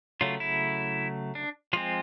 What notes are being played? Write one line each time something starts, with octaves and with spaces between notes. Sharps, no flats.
C#3 F#3 A3 F4
E4
D4
F3 G#3 C4 F4